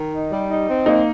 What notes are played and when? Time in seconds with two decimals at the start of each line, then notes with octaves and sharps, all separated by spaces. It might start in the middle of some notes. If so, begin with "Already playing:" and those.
Already playing: D#3
0.12 D#4
0.30 G3
0.48 D#4
0.68 C4
0.86 A#3 D#4